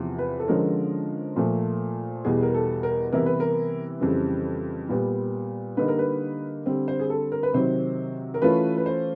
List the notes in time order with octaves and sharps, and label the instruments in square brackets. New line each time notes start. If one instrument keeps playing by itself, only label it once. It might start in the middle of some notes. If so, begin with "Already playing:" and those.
Already playing: [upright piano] E2 C3 F3
B4
A4
D3 F3 G#3 C#4 A#4
A#2 F3 A3
E2 B2 G3 G#4
A#4
A4
A#4
C3 E3 G3 B3 E4 A#4
B4
A#4
F2 C#3 E3 G3 C4
A#2 G3 B3
D3 G3 A#3 D#4 B4
A#4
B4
D3 G3 C4
C5
G#4
A4
A#4
B4
C3 D#3 F#3 C5
A#4
E3 A3 C#4 F4 B4
B4
C5